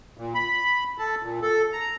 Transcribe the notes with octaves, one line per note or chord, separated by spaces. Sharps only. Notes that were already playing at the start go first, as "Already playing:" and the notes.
A#2
B5
A4
A#2
A4
A#5